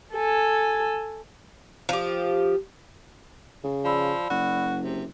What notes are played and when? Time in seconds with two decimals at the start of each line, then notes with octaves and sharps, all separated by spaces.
0.13 A4 G#5
1.89 F3 G4
3.64 C#3
3.84 F3 D5 B5 E6
4.30 F#1 F#4
4.84 C3